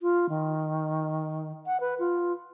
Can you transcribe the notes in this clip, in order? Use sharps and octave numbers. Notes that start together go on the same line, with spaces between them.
F4
D#3
F#5
B4
F4